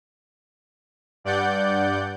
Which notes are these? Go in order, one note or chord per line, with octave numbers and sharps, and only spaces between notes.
G2 D5 F#5 G6